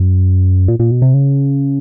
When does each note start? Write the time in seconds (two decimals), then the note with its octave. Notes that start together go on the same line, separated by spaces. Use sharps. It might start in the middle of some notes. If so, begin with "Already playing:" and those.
Already playing: F#2
0.68 A#2
0.79 A#2
0.91 B2
1.02 C3
1.14 C#3